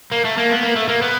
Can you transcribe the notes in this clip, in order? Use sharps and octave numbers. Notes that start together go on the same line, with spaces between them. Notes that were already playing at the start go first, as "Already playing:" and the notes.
A#3
A3
A#3
B3
A#3
A3
A#3
B3